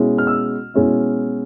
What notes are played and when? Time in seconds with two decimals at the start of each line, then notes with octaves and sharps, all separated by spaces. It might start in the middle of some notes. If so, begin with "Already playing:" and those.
Already playing: B2 G#3 C#4 E4
0.18 F6
0.27 E6
0.74 B2 G#3 C#4 E4